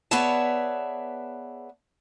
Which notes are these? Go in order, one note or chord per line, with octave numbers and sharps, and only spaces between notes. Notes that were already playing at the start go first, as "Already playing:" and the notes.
B3 G#4 C#5 D5 E5 A5